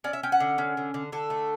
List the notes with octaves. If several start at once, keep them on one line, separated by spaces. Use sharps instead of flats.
C#4 D5
E5
C#4 G5
F#5
D3
C#4
D3
D3
D3 A4
A3